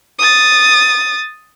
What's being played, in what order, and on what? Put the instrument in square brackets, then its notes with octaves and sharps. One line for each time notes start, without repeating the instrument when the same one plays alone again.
[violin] D#6 A6